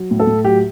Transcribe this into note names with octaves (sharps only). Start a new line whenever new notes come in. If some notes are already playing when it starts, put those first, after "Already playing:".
Already playing: F#3
A2
A4
A2
F#3 G4